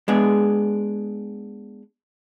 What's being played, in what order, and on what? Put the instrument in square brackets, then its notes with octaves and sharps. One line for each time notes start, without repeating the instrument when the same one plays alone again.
[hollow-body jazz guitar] G#3 B3 D4 G#4